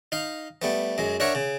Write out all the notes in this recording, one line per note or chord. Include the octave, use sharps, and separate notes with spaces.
D#4 F5
G3 A3 B3
F#2 G#3
D4 A#4 C#5 E5 F#5
C#3